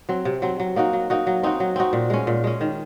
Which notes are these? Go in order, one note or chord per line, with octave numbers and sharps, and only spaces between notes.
F#3 C4
C3
F#3 C4
F#3
A#3 D#4 F#4
F#3
A#3 D#4 F#4
F#3
C4 D#4 F#4
F#3
C4 D#4 F#4
A#2
G#3 C#4
A#2
G#3 C#4
D#3